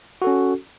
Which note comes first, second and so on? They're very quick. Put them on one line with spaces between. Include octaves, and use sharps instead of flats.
F#4 A4 C#4